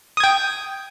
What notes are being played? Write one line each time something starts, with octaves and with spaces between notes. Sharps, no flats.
G5 D#6 G#6